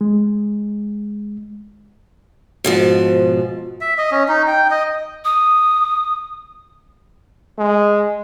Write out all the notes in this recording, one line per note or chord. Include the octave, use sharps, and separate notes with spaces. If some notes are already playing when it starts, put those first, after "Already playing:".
G#3
G#2 B2 F3
E5
D#5
C#4
D#4
G5
D#5
D#6
G#3